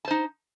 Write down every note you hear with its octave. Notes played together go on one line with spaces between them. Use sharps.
D#4 C5 A5